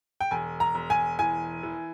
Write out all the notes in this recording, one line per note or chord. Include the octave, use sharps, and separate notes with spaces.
G5
E1 G#5
A#5
E1
G#5
E3 G#5
E3